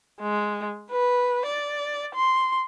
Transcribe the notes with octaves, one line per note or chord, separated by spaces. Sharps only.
G#3
B4
D5
C6